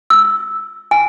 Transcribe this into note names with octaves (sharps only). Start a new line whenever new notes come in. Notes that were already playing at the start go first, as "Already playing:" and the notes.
E6
G#5